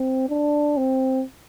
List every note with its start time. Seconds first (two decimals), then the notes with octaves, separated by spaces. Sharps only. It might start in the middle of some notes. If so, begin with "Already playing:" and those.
Already playing: C4
0.29 D4
0.77 C4